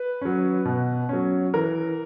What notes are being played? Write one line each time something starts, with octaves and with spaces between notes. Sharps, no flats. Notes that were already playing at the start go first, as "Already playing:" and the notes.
Already playing: B4
F#3 C#4
B2
F#3 C#4
E3 A#4